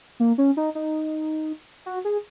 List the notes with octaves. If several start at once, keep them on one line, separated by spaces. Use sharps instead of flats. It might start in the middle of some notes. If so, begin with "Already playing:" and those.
A#3
C#4
D#4
D#4
F#4
G#4